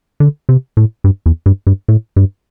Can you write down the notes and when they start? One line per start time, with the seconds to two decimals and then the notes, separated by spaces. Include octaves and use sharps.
0.20 D3
0.49 C3
0.77 A2
1.04 G2
1.26 E2
1.46 G2
1.67 G2
1.88 A2
2.16 G2